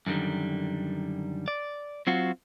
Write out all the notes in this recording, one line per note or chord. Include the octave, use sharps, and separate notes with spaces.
F#2 D3 D#3 G3
D5
F#3 C4 F4 F#4